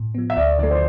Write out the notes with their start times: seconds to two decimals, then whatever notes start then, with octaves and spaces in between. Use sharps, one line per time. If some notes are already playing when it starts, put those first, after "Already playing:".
Already playing: A2
0.15 F3 B3
0.30 E5
0.37 D2 D5
0.58 D3 F3 A3 D5
0.71 C5